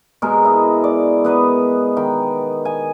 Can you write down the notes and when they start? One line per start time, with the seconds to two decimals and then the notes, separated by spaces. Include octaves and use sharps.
0.22 B2 G#3 A#4
0.44 E4 D#5
0.84 D5
1.25 B3 B4 D#5
1.97 D#3 G5
2.65 G#5